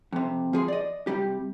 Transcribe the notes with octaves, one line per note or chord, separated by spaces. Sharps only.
F2 C3
F3 G#4 C6
D5 D#5
C3 G3 G4